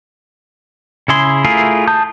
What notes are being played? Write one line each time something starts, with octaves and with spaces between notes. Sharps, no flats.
C#3 E4 G#4 C6
A3 E4 F4 G#4 A#4
A5 D#6 G6